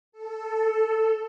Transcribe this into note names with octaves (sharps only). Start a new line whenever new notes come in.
A4